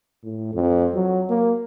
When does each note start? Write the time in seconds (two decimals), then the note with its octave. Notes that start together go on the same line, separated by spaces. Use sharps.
0.24 A2
0.54 F2
0.94 F#3
1.29 A#3